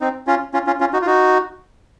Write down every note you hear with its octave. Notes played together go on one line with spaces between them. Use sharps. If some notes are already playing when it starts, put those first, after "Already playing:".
C4 D#4
C#4 F4
C#4 F4
C#4 F4
C#4 F4
D#4 F#4
F4
D#4 F#4